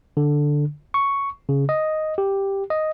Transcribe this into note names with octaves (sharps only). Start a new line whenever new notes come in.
D3
C#6
C#3
D#5
G4
D#5